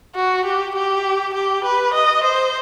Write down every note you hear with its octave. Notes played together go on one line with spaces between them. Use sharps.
F#4
G4
G4
G4
B4
D#5
C5